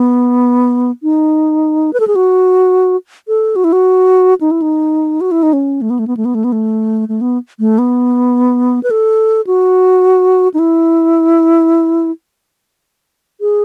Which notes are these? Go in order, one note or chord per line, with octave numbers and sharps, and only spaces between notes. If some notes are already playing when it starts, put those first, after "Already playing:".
Already playing: B3
D#4
B4
A4
G#4
F#4
A4
F#4
E4
F#4
D#4
E4
D#4
F#4
E4
D#4
C#4
A3
B3
A3
B3
A3
B3
A3
B3
A3
A3
B3
A3
B3
B4
A4
F#4
D#4
E4
G#4